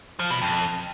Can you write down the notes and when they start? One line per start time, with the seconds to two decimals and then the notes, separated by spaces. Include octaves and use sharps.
0.19 F3
0.31 B2
0.42 F2